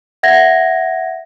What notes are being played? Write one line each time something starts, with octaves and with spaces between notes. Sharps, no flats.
E5 F#5 G#6 A#6